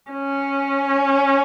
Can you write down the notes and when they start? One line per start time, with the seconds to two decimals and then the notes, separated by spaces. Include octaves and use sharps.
0.12 C#4